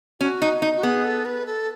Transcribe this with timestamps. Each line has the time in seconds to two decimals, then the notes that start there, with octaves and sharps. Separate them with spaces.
0.20 C#4 F#4
0.42 D#4
0.62 D#4
0.76 F#4
0.83 B3 G#4
1.04 A4
1.25 B4
1.46 A4